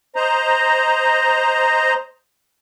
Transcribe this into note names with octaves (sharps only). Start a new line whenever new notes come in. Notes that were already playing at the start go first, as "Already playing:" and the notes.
C5 D#5 A#5